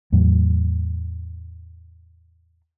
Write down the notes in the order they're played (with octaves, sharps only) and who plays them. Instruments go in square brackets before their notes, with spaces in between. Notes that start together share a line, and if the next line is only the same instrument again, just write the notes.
[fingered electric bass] E2 A2 F#3